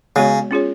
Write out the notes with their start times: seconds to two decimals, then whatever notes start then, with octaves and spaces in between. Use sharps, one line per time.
0.16 C#3 G#3 B3 F#4 C#5
0.51 C#4 F4 G#4 C#5